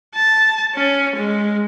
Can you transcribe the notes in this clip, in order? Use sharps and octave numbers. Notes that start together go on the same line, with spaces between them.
A5
C#4
G#3